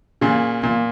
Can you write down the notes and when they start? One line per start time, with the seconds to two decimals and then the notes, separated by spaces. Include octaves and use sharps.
0.21 A#2 C#3
0.63 A#2